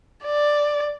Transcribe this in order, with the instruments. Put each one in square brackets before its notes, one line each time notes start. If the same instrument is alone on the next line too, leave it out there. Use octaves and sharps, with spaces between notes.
[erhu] D5